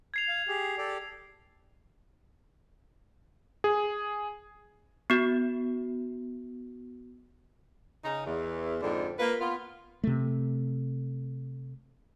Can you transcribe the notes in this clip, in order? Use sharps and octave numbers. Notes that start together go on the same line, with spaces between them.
G#6 C7 F7
F5
G4 G#4
G4 A4 D5
G#4
B3 F#4
C#3 D#4
E2
F2 G#2 D3
A#3 F4 B4
B3 F4
C3 A3